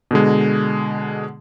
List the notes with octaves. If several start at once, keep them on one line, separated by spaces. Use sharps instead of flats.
B2 D3 G#3